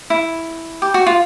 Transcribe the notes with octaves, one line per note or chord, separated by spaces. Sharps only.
E4
G4
F#4
F4